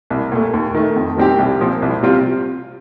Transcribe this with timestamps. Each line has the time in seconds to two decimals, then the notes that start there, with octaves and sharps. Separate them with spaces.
0.10 C2
0.32 A#2 A3
0.54 D#2
0.74 D#3 A3
0.96 F2
1.17 D#3 G3 C4 G4
1.39 C2
1.61 A#2 F3 C4
1.82 C2
2.03 C3 G3 C4 F4